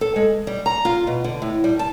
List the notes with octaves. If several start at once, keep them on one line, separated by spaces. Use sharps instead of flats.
A4
G#3
G3
A#5
F4
B2
D3
A2
G3
A5